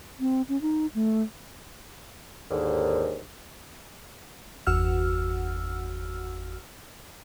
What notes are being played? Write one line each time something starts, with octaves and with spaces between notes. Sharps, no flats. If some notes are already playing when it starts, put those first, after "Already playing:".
C4
C#4
D#4
A3
D#2 G#2 D3
G1 E2 F#4 F#5 E6 F6